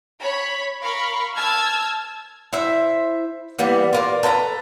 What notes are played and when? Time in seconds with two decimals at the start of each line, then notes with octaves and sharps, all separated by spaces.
0.20 C#5 B5
0.81 A#4 F5 B5 C#6
1.37 A5 E6 F6 G#6
2.53 E4 C5 E5
3.59 E3 G3 A#3 B3
3.93 F4 A#4 D5
4.23 A4 B4 E5 A#5